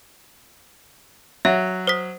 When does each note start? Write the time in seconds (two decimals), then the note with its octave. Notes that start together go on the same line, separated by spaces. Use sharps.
1.45 F#3 E5
1.87 C5 D#6 B6